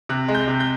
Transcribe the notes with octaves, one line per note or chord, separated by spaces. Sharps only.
C3 F#6
G#3
G6
C3
G6